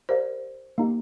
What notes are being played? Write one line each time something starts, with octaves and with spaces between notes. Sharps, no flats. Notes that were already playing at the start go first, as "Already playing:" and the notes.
G4 A#4 C5 D5 F5
A#3 D#4 G4